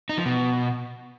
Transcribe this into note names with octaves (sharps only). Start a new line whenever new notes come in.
D#4
F3
B2